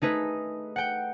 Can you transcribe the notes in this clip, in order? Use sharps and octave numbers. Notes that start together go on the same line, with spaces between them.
A3 D#4 G#4 B4
F#5 G5